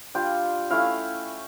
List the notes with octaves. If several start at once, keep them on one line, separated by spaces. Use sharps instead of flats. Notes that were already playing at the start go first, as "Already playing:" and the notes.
G3 D4 F4 G5
A3 C#4 E4 F5